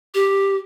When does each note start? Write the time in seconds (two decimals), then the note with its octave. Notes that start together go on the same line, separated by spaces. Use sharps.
0.14 G4